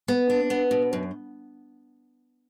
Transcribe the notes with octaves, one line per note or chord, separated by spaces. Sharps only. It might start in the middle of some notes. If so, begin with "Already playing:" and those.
B3
D4
B3
B2
F#2